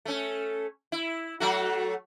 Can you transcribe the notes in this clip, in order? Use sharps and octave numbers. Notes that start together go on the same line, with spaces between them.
A3 C#4
E4
F#3 A3 F#4